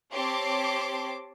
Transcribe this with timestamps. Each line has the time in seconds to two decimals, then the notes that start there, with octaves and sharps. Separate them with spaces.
0.12 C4 G4 C#5 A5 C6 D6